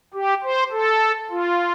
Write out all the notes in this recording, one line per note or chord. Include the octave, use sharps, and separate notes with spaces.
G4
C5
A4
F4